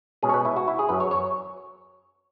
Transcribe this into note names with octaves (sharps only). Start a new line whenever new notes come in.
B2 G#3 C#4 G#4
C#5
B4
E4
F#4
E4
G#4
F#2 F#3 C#4 B4
C#5
C#5